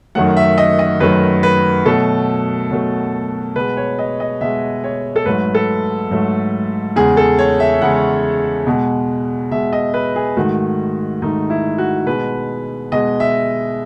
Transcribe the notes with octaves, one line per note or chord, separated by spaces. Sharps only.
F#2 D#3 F#3 A3 F#5
E5
D#5
D#5
F#2 D#3 F#3 A3 B4
B4
B2 F#3 A3 A4
B2 F#3 A3
B2 G#3 B4
C#5
D#5
D#5
B2 G#3 E5
C#5
A4
G#2 F#3 A3 B4
A4
G#2 F#3 A3
E2 C#3 G#3 G#4
A4
C#5
E5
E2 C#3 G#3 F#5
B2 G#3
B2 G#3 E5
D#5
B4
G#4
G#2 D#3 A3 F#4
G#2 D#3 A3 D#4
E4
F#4
B2 G#3 B4
B2 G#3 D#5
E5